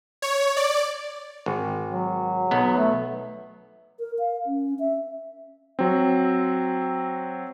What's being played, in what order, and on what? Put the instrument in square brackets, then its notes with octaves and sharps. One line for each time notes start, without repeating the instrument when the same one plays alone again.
[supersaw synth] C#5
D5
[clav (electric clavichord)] G#1
[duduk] F#3
[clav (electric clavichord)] B1 B3
[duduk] A3
[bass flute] A#4
F5
C#4
E5
[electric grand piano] F#3 C4